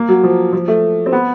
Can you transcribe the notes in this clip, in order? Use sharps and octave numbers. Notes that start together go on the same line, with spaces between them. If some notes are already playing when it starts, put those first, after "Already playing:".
Already playing: A#3
F#3
F3
F3
A3
C4
B3